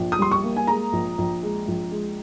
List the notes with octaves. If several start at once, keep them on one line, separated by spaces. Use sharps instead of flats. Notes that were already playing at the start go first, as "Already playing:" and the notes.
Already playing: A#1
D#6
G3 C6
C#6
A#3
G#5
G#3 A#5
A#1
A#1
G#3
A#1
G#3